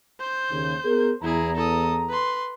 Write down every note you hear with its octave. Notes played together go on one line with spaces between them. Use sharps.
C5 G6
D#2 C#3
B3 G#4 A#4
E2 E4 G#4 A#5
A4 D#6
B4 C6